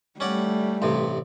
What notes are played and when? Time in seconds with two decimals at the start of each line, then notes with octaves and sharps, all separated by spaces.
0.20 G3 A3 C#4 D5 F#5
0.82 A1 G2 C3